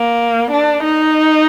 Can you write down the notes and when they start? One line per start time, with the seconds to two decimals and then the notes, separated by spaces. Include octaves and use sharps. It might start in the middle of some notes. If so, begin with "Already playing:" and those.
Already playing: A#3
0.51 D4
0.82 D#4